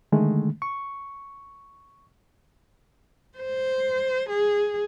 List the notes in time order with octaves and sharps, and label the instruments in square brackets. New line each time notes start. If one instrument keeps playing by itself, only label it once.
[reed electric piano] D3 D#3 G#3 A3
C#6
[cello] C5
G#4